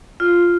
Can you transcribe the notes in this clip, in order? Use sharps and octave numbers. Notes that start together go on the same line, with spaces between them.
F4